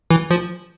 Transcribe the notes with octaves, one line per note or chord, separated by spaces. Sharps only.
E3
F3